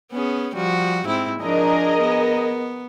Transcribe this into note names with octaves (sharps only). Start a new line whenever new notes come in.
B3 C#4 G#4
F3 G3 F#4
G#2 C4 E4
F3 D4 G#4 A#4 D#5
B3